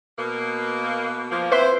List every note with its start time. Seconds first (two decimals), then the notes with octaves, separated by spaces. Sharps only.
0.18 B2 A#3
1.31 F3 A#3
1.52 C4 E4 B4 C5 E5 C6